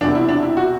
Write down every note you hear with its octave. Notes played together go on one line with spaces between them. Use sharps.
E1 E2 C3 D4
E4
D4
E4
F#4